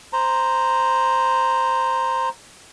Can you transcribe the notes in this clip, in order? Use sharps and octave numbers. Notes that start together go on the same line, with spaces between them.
C5 A#5